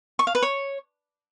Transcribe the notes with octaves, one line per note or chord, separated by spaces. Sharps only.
C#6
F5
B4
C#5